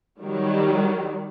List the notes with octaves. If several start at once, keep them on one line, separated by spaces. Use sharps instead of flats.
D#3 F#3 G3